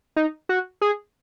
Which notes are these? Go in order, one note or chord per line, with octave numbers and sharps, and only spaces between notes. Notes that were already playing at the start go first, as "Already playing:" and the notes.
D#4
F#4
G#4